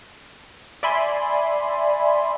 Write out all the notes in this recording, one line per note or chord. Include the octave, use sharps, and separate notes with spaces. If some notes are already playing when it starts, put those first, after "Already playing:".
D5 E5 G#5 B5 C6